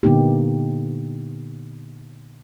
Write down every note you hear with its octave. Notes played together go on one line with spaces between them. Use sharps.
A#2 D3 A#3 B3 D#4 G4